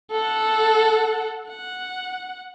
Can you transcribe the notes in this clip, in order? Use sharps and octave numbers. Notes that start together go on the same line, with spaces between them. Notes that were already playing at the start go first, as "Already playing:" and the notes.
A4 F#5
F#5